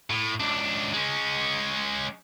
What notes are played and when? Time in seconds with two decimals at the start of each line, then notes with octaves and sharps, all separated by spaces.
0.10 A2
0.40 C#2 D4
0.93 G#3 C#4